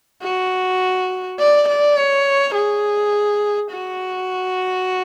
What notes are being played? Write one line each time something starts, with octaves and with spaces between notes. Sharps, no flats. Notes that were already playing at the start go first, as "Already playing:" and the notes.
F#4
D5
D5
C#5
G#4
F#4